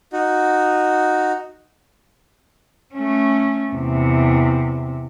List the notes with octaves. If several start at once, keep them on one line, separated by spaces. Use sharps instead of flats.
D#4 F#4
A3 C#4
E2 C3